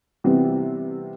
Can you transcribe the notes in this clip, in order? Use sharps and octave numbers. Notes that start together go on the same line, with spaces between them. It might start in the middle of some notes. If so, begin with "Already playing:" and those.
C3 E3 G3 B3 C4